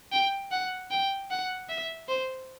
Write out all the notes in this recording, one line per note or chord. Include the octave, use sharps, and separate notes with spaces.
G5
F#5
G5
F#5
E5
C5